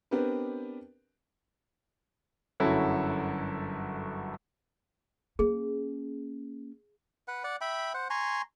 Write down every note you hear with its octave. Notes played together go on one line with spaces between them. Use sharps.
B3 C4 D4 G4 A#4 B4
G1 F#2 E4 F#4 A4 C#5
A#3 C#4 G#4
B4 F#5
D5 F#5
E5 G5 B5
C5 F#5
G#5 A#5 C6 C#6